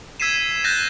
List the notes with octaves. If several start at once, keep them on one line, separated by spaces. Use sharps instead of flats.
E6 G#6 B6 C7 D#7 E7
F#6 G6 A6 A#6 D#7